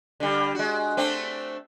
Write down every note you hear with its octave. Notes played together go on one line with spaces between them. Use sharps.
D3 G3
G#3 F#4
A3 C4 D4